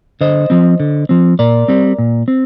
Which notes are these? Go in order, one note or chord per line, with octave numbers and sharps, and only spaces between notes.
D3 C5 D#5
F3 C4
D3
F3 C4
A#2 A#4 D5
G3 C4
A#2
C4